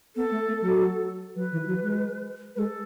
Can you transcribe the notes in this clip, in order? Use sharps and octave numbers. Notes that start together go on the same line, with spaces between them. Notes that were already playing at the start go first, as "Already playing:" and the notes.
B3 A4
A3
A3
F#3
F#3 B4
E3
F#3
G#3
G#3 B4
A4